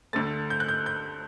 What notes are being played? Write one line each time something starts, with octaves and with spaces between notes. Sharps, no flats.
D2 D3 A3 A6
G6
F#6
G6
G6